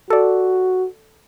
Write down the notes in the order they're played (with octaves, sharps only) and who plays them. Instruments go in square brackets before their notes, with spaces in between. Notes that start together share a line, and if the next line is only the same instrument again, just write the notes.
[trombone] F#4 [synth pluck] A4 D5